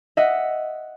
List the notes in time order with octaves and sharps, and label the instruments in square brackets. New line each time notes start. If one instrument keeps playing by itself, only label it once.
[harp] D#5 E5 F#5